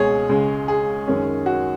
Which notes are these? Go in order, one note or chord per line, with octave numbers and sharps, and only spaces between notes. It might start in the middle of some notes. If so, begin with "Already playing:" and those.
Already playing: C#2 B2 G#3 G#4 C#5
C#2 C#3 G#3
G#4
F#2 D#3 G#3 C#4
F#4